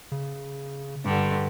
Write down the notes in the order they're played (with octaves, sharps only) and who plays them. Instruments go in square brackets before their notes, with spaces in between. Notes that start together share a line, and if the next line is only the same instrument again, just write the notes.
[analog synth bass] C#3
[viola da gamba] G2 D3